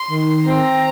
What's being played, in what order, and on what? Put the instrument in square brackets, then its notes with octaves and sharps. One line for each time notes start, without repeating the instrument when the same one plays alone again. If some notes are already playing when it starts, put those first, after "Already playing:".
Already playing: [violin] C6
[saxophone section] D#3
[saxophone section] C4 [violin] A#5